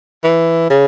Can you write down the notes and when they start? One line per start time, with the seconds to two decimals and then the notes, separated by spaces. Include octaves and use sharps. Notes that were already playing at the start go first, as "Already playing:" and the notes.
0.24 E3
0.70 C#3